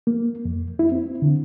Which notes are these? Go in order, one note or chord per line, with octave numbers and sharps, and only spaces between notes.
A#3
F2
E4
C4
D3